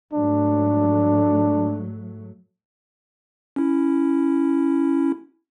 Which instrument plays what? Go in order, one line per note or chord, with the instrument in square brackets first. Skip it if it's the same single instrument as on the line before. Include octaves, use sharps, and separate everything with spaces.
[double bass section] G#2 F#3 A3 [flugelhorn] D4
[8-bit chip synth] C#4 E4